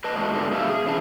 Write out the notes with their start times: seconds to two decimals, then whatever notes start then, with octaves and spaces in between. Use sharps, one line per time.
0.04 B4 D#5 A5
0.16 G#2 B2 E3 G#3 A3
0.34 G#2 D3 G3 G#3
0.51 B2 A3 E5 F5
0.69 G#4
0.86 C#3 E3 E4 E5 A5